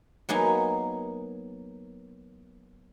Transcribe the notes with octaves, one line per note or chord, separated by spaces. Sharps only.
F#3 A#3 B3 D#4 G#5